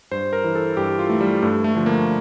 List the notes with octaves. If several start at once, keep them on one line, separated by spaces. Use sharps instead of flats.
G2 C5
A#4
E3
A4
G2 G4
F4
E3 A3
G3
G2 A3
A3
D3 F3
A#3